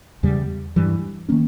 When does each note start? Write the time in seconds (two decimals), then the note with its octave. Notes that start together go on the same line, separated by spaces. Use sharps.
0.23 E2 C#3 G3
0.76 G2 E3 G3
1.29 D#3 A#3 C#4